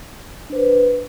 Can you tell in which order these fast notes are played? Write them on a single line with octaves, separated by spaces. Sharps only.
D4 C5 B4